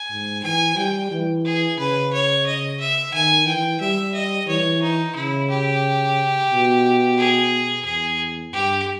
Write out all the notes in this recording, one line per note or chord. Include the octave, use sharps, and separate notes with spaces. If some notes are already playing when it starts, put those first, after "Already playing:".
Already playing: G#5
G#2
E3 G#5
G3 G5
E3
G#4
C#3 B4
C#5
D#5
E5
D#3 G#5
E3 G5
G3 E5
D#5
E3 C#5
D#4
C#3 E4
G4
B2
G#4
E2 G#4
G2 G4